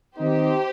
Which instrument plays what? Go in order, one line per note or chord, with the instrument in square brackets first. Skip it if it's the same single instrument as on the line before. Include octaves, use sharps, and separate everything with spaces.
[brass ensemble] D#3 C4 D#4 [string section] G4 C5